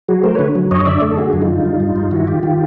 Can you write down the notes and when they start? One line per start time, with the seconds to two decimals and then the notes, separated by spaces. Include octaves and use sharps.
0.08 F#3 F#4 G#4
0.24 A3 A#4 C5
0.35 D3 B4 C#5
0.55 F#3
0.71 F#2 C#5 D#5
0.86 D3 D5 E5
1.02 A3
1.11 A4
1.17 D3 F#4 G#4
1.33 F#2
1.41 D#4 F4
1.49 D3
1.65 G3
1.80 G2
1.96 G2
2.11 D#3 E4 F#4
2.27 D#3 F4 G4
2.43 D#3 F4 G4